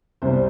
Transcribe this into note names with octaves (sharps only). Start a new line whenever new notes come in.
C2 C3 G3 C4 C5